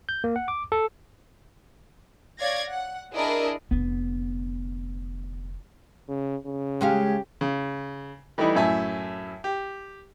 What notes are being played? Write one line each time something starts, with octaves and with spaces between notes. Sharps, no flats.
G6
A#3
F#5
D6
A4
C#5 D5 F5 G#6 A#6
F#5
D4 E4 G#4 A#4 D#5
F1 D3 B3
C#3
C#3
G#3 C#4 G4 F5
C#3
E3 G3 A3 D#4 E4 D#5
F#2 A2 E5 G#5 A5
G4